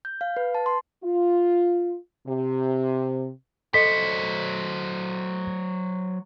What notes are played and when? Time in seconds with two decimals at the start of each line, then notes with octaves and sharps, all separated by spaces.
0.05 G6
0.21 F5
0.37 B4
0.55 A5
0.66 C6
1.04 F4
2.27 C3
3.74 F#3 A4 C5 D#5 B6 C#7